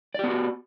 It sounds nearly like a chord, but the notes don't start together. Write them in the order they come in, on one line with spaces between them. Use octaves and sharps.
D5 G4 B3 F#4